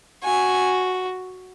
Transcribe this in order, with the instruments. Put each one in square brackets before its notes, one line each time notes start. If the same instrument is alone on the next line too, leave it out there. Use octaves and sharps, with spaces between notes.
[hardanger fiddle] F#4 [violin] G#5